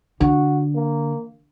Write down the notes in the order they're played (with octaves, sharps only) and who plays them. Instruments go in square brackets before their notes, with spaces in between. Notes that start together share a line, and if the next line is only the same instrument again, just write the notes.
[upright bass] D3 [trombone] F#4
[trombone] A#3